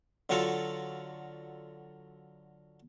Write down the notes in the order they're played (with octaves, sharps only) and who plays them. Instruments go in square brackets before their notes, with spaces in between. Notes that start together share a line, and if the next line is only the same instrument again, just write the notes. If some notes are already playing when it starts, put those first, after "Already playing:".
[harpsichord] D3 F#3 F4 F#4 A4